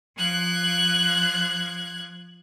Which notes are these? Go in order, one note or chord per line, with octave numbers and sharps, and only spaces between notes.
F3 F#6 G#6